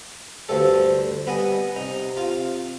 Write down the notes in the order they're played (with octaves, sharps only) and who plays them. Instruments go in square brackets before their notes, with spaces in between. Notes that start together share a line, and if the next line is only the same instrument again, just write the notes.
[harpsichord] D2 G2 A4 [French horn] C5
[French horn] G3 [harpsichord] B3 D#5 G#5
[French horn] C3 [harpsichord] D#4
[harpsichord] F4